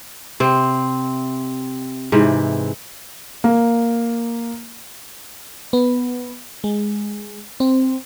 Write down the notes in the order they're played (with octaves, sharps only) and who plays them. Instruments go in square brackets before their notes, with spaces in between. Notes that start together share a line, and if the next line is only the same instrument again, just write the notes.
[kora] C3 C4
G#2 C3 E3
[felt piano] A#3
[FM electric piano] B3
G#3
C4